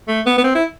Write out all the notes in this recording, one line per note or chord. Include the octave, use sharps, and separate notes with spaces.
A3
B3
B3
C4
E4